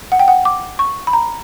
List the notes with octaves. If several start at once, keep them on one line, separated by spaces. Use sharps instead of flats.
F#5
G5
F#5
D6
C#6
B5
A#5